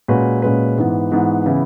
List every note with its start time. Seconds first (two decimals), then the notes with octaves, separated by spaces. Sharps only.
0.08 A#2 G#3 C#4 F#4 B4
0.42 A#2 G#3 C#4 F#4 B4
0.77 G#2 E3 B3
1.12 G#2 E3 B3
1.46 C#3 E3 B3 E4